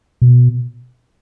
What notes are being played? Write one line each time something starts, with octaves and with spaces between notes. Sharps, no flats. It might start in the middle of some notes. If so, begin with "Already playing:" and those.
B2